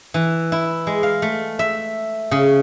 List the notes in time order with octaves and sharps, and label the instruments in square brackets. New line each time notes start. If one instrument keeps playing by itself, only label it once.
[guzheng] E3
E4
G#3
F5
A3
E5
C#3